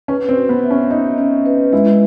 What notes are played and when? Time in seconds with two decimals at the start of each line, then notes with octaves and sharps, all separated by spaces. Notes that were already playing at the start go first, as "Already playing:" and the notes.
0.08 C#4 B4
0.29 C4
0.36 F#4
0.49 B3
0.63 E5
0.70 C#4
0.91 D#4 E5
1.18 C#4
1.46 B4
1.73 G#3 E4